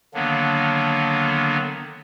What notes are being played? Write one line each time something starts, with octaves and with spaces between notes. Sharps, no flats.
D3 D#3 F#3 A#3 B3 D4